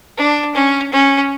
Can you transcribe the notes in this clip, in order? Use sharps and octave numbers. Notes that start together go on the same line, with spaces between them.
D4
C#4
C#4